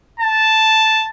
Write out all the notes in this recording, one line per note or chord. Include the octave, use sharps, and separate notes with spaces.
A5